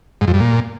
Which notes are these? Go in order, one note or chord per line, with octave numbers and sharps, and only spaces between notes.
G#2
F2
G2
A#2